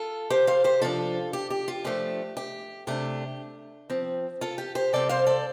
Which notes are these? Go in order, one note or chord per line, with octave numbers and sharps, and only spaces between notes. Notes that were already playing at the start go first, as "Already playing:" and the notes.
Already playing: F4 A4
G4 C5
C5 F5
G4 C5
C3 F3 D4 F4 A4
G4
G4
F4
F3 A3 D4 G4
G4
C3 A3 D4 G4
F3 C4
F4 A4
G4
G4 C5
C3 G3 C4 A4 D5
C5 F5
A4 D5